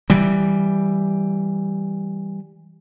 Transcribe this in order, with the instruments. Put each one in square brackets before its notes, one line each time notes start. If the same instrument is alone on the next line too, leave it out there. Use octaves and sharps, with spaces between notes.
[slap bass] E3 G3